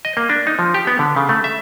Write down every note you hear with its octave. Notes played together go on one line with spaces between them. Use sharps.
D#5
A#3
D4
D#4
F3
G4
B3
D3
C#3
A3
E5